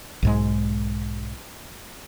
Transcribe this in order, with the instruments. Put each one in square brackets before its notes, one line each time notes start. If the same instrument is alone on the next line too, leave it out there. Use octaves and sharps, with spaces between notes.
[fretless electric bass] B1 G#2 G#3